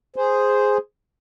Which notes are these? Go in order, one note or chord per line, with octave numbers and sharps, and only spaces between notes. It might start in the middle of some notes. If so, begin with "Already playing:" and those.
G#4 C5